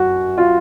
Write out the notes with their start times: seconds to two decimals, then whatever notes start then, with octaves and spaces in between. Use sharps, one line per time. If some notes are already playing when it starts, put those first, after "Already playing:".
Already playing: F#2 F#4
0.38 F4